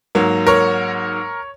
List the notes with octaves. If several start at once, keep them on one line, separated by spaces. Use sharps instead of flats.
G#2 F#3 A#3
A#4 C#5